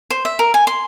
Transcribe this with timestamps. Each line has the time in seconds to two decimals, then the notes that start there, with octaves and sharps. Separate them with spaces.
0.10 C5
0.25 E5
0.39 A#4
0.54 G#5
0.67 C6